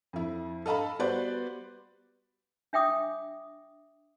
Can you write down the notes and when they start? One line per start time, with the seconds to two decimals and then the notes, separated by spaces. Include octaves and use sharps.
0.13 F2 E4
0.66 A4 D#5 F5 A5 B5
0.99 G3 B3 F#4 B4 C5 D5
2.73 D4 E5 G5 D6 D#6